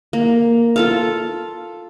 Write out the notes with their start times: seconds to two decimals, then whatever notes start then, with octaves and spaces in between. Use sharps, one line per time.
0.13 A#3
0.76 F4 A4 F5